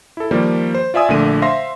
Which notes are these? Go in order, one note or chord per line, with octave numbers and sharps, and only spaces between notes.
E4 A4
D#3 F3 G3 A#3
C5
F4 D5 E5 G#5 D#6 E6
A#1 A#2 D3 A3 D#7
C5 E5 F5 C6 A#6